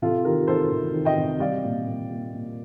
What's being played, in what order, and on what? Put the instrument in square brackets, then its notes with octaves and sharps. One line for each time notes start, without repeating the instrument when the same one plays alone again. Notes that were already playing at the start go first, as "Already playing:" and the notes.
[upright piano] C3 F4 A4
D#3 G4 A#4
D#3 A4 C5
C3
D#3
D#5 G5
C3
G3 D5 F5
A#2
A#2
A#3
A#2